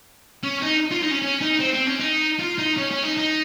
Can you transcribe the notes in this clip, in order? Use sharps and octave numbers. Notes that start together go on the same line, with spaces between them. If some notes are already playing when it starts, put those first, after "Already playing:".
C#4
D#4
F4
D#4
C#4
C#4
D#4
C4
C4
C#4
D#4
F4
D#4
C#4
C#4
D#4
D#4